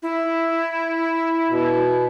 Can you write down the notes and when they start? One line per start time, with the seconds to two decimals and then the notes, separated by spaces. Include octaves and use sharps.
0.02 E4
1.49 B2